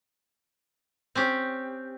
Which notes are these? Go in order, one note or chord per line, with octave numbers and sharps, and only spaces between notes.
C4 C#4 G4